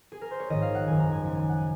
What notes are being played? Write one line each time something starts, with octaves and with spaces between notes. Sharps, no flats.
G#4
A#4
C5
C#5
A#1 G#2 D#3 D#5
F5
F#5
F#1 F#2 D#3 G#5
A#5
G#5
C#2 C#3 G#5
G#5
F#5
G#5